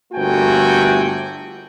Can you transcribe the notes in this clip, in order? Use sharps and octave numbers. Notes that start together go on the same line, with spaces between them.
G1 A#2 A3 F#4 G5 G#5